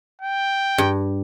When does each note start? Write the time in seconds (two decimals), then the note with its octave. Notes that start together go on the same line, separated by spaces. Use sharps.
0.22 G5
0.78 G2